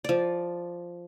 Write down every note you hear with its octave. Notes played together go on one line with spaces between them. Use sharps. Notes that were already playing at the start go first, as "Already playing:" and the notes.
F3 D5